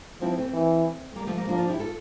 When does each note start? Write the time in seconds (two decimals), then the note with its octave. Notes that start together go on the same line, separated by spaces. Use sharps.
0.21 F3 C4 E4
0.38 A3 C4
0.53 E3
1.16 G3 A#3
1.27 F3 A3
1.37 G3 A#3
1.48 F3 A#3 D4
1.58 D4 F4
1.69 E4 G4
1.79 F4 A4